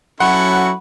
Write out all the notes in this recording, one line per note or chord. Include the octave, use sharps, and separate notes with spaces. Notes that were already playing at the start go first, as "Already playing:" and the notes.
F#3 C#4 E4 F#4 A4 F#5 B5 C#6